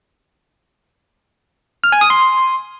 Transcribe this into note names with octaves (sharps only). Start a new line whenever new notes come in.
F6
G#5
D#6
C6